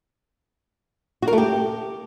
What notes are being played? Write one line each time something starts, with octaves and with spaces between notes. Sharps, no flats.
F#4
A#4
A3
G4